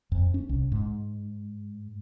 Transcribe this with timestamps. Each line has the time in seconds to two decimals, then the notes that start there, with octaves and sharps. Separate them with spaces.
0.12 F2
0.34 C#4
0.49 C2
0.72 G#2